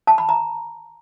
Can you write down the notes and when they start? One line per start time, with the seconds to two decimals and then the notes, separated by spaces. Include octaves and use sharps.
0.07 A5
0.18 B5
0.29 A#5